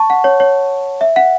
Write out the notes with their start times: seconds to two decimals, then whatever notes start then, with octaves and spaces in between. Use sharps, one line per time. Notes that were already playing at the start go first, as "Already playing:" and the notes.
Already playing: A5 C#6
0.10 F#5
0.24 C#5
0.40 C#5
1.01 E5
1.16 F#5